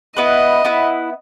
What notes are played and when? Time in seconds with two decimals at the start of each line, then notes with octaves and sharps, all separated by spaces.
0.16 B3 E4 B4 D#5
0.64 B3 E4 B4